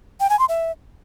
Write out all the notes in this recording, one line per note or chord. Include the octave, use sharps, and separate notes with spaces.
G5
G#5
C6
E5